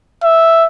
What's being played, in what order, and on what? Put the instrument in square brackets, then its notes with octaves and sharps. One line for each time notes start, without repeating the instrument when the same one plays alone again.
[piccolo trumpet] E5